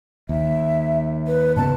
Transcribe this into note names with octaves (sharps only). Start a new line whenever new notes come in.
D#2 E5
B4
G#2 C#3 B3 A5